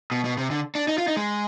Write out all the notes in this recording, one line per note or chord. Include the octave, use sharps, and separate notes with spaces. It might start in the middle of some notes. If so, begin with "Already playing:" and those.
B2
B2
C3
D3
D4
D#4
F4
D#4
G#3